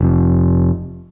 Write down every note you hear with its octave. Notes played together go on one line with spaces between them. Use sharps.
F1 F2